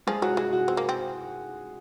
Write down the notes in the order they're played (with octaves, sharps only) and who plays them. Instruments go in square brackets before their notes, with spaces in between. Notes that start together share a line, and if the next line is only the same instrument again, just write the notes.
[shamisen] F3 [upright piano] G#3 G#4
[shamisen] F#3 [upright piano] F#4
[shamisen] G#3 [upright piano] F#4
[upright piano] F#4
[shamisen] C4
A#3
C4